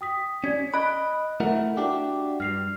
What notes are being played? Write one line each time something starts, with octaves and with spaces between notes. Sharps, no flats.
G5 D#6 B6
C#4 D5 G#6 B6
D#5 B5 F#6 D7
A3 E4 A#4 E5 F#5
D4 F#4 G4
G2 F6 C7 F7